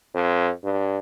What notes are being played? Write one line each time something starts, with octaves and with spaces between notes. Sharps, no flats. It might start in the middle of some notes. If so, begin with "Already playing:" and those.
F2
G2